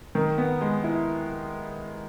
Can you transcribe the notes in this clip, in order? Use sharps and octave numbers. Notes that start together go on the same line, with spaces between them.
D#3
B3
G#3
E4